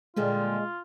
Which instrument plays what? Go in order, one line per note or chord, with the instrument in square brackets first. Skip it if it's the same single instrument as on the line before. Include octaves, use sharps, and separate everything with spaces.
[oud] A#2 D3 G3 [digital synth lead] G#3 [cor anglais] F4